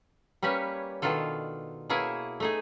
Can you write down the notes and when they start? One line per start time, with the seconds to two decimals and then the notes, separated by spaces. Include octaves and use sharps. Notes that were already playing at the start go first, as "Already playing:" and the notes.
0.43 G3 A#3 C#4 B4 C#5
1.02 B2 D#3 D4 F4 A4
1.90 B2 A#3 E4 G#4 C#5
2.40 A3 D#4 G#4